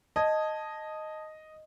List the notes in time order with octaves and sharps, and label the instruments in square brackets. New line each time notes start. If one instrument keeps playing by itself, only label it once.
[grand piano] D#5 [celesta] A5 D#6 G#6